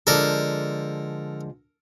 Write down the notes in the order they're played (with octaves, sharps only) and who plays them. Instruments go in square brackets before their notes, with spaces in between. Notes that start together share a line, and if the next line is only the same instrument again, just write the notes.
[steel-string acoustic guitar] D3 F3 G#3 [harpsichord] A4 A#4